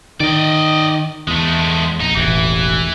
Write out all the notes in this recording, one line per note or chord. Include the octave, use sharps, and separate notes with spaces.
D#3 D5 D#5
E2 G#3 A3
A#1 D#4
E1 A1 E3